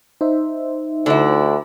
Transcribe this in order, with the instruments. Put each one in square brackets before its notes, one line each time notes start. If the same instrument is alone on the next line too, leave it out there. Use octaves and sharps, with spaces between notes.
[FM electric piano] D#4 C5 E5
[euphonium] D2 [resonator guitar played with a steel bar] D3 E4